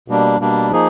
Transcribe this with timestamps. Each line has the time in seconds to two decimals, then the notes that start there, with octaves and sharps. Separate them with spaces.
0.08 B2 G3 A#3 D4
0.40 B2 G3 A#3 D4
0.72 F3 A#3 D#4 G#4